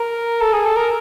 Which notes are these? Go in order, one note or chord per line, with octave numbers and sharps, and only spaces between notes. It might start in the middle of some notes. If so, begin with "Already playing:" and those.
Already playing: A#4
A4
G#4
A4
A#4